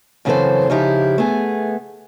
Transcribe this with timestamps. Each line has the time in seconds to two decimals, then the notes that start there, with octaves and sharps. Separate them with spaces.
0.25 F#2 C#3 E3 C4 A4 C5
0.70 C#3 F3 D#4 E4 G4
1.18 A3 B3 G#4